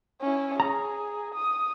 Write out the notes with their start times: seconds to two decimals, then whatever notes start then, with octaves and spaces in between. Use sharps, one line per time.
0.22 C#4 E4
0.60 G#4 A#5
1.34 D#6